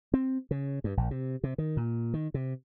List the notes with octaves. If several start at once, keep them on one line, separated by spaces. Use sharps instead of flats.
C4
C#3
G2
A#1
C3
C3
D#3
A#2
D#3
C3